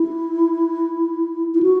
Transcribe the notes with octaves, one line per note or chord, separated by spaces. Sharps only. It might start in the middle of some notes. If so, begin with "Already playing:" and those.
Already playing: E4
E4
F#4